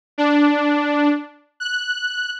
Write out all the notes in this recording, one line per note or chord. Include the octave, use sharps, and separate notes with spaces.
D4
F#6